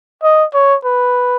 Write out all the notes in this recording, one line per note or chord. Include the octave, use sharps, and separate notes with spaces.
D#5
C#5
B4